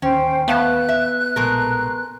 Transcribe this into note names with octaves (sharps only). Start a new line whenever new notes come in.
D1 D#2 C#4 C5 G5
A3 B3 F5 A5 F#6
E5
A#1 B2 G#3 A3 A#4